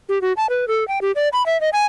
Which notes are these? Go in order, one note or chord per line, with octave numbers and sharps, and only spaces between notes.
G4
F#4
A5
B4
A4
G5
G4
D5
B5
E5
D#5
G#5